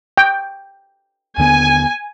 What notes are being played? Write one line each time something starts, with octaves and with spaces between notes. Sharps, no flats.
G5
D#2 D3 B3 G#5